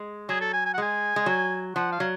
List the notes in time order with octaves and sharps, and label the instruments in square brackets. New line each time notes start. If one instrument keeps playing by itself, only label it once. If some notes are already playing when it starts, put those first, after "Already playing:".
Already playing: [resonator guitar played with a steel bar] G#3
[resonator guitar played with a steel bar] F#3 [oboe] G#4
[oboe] A4
G#5
G#5
F#5
[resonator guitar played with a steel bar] G#3 [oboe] G#5
[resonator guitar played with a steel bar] G#3
F#3
[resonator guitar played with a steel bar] F3 [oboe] F#5
[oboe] F5
[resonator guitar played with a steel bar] F#3